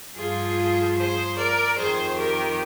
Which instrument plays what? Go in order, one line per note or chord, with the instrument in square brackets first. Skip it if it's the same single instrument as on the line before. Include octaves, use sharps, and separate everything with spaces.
[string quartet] G2 F3 F4 G#4
G#4 C5
A#4 D5
F2 D#3 G#4 C5
G4 A#4